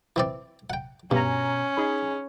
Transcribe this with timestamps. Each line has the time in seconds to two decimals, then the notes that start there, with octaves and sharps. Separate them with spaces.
0.16 E3 C4 D5
0.70 F#5 G5
1.11 G2 B2 C#4 G#5 A#5
1.77 D#4 G#4 B5